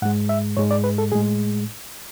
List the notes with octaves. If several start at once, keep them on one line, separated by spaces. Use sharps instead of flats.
G#2 G#3 F#5
E5
G#2 G#3 C#5
D5
B4
A4
A2 G#3 G#4